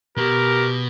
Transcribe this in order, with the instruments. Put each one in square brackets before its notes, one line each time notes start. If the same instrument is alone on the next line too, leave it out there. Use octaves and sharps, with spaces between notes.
[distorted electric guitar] B2 [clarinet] G4 [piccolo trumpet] A#4